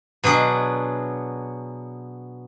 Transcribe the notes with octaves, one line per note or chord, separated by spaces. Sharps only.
B2 F#3 D4 G#4